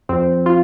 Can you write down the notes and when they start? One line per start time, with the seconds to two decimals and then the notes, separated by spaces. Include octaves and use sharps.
0.09 F2 C4
0.46 F4